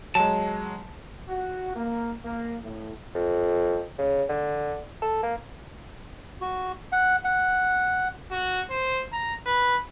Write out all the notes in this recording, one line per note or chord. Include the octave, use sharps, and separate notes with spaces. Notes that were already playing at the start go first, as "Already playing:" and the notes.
F#3 G#3 A5
F#4
A#3
A#3
A2
F2
C#3
D3
A4
A#3
F#4
F#5
F#5
F#4
C5
A#5
B4